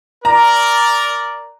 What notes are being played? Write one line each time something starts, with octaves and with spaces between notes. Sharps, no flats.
A#4 D5 A#5